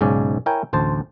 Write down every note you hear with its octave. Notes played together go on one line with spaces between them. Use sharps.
B1 G#2 C#3 C#4 D5
E4 A#4 C#5 G5 G#5
A1 D2 C5 A5